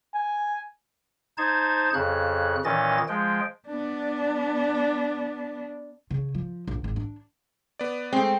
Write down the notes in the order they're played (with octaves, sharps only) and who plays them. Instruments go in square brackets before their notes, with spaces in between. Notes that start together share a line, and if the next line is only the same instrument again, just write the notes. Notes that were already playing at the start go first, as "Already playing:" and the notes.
[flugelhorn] G#5
[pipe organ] D#4 C5 A5 G#6
F2 C#3 F#6
A#2 D#3 E3 C#4 D#5 A6
F3 G#3 G5
[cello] B3 D4
[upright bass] C#3
F3
A#1
G#1
D4
[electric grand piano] B3 D5
[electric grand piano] G#3 A3 [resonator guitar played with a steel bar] C4